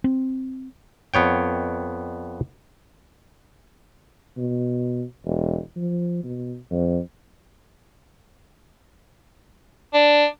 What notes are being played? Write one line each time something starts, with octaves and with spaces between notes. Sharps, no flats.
C4
F2 B3 C#5 G5
B2
E1
F3
B2
F2
D4